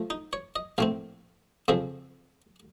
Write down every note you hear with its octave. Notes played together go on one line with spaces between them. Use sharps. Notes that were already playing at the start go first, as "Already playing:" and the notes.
Already playing: F3 A3
D#4
C#5
D#5
A#1 A2 A3 C4 F5
F2 C#3 F3 C4